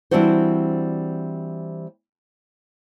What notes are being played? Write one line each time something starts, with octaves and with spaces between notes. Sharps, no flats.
E3 G3 C4 D4 F#4 C5